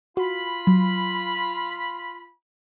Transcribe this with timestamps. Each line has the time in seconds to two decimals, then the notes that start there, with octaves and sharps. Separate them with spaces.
0.17 F4 F#4 B5
0.67 F#3